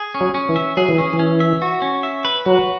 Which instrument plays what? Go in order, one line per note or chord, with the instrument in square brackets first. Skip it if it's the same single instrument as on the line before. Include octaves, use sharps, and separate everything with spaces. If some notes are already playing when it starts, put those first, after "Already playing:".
Already playing: [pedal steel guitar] G#4
C#4
[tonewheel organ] F#3
[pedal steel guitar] C#4
[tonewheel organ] E3
[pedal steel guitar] E5
[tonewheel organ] F#3 [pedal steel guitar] G#4
[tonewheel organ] E3
[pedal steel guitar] C#4
[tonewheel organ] E3
[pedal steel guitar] C#4
E5
F#4
C#4
E5
B4
[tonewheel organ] F#3 [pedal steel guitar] F#4